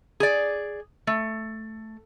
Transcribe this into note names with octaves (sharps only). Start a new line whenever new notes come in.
G#4 D5
A3